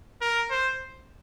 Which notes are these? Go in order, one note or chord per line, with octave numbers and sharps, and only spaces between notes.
A#4
C5